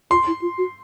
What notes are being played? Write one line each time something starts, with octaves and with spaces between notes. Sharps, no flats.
F4 C6
E4
F4
F#4